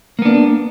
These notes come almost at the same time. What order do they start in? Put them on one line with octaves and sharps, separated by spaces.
A#3 B3 D4